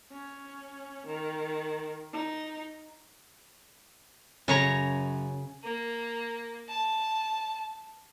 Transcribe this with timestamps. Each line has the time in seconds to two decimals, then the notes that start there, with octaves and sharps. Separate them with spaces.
0.11 C#4
1.07 D#3
2.13 D#4
4.48 F#2 C#3 C#5 A#5
5.63 A#3
6.69 A5